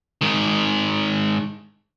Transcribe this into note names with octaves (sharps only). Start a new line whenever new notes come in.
G#2 D#3